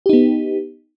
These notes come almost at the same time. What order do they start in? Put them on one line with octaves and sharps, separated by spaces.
G4 D#4 B3